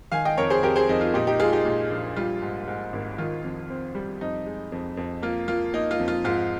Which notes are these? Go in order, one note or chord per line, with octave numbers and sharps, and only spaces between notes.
D#3 F5 G#5
D#5 G5
F2 A#4 C#5
G#4 C5
F2 G4 A#4
G#4 C5
F2 D#4
F4
A#2 D#4 G4
D#4 G4
G#3 F4 G#4
D#4 G4
A#2
A#1
G3 F4
G#2
G#2
G#1
D#3 F4
F2
C4
G3
F2 D#4
G#3
F2
F2
A#3 F4
A#3 F4
A#3 D#4
F4
F2
F4
G#2 F4